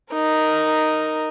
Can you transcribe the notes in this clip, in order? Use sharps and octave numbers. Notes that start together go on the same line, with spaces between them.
D#4 A#4